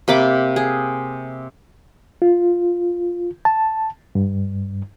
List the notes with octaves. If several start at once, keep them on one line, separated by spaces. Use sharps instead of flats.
C3 A#3 B5 D6
G#4
F4
A5
G2